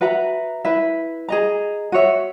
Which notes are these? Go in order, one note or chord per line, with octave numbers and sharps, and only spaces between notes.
F#4 B4 E5 A#5
E4 B4 E5
G#4 D#5 A#5
F#4 C#5 E5